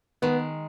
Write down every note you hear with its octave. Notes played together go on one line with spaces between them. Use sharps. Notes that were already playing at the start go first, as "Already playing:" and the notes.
D#3 G#3 B3